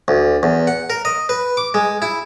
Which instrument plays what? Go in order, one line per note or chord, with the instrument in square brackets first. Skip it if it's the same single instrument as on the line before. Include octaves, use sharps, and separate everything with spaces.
[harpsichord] D2
E2
F#5
A#4
D#5
B4
D6
G#3
E4